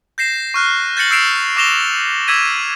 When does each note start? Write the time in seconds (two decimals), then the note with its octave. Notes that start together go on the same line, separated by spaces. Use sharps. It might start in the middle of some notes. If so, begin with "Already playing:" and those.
0.18 G6 A#6 C7 E7
0.54 C#6 F6 F#6
0.97 G6 A6 A#6 C#7 F#7
1.11 E6 G6 C7 D7 E7 F7
1.56 C#6 D6 A#6 E7 F7 G7
2.28 D6 E6 G#6 B6 D#7